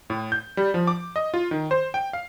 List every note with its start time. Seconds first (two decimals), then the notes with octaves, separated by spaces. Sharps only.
0.10 A2
0.32 G6
0.57 G3
0.74 F3
0.87 D6
1.16 D#5
1.34 F4
1.51 D#3
1.71 C5
1.94 G5
2.13 F5